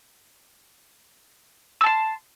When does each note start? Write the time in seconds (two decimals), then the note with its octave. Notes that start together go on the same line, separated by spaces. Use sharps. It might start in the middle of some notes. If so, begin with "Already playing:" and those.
1.81 E6
1.84 A5
1.86 C6